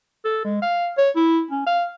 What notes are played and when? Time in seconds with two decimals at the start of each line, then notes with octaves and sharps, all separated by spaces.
0.25 A4
0.44 G#3
0.62 F5
0.98 C#5
1.16 E4
1.51 C#4
1.66 F5